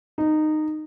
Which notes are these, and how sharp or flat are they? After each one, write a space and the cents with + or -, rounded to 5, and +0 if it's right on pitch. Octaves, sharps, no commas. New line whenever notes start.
D#4 -15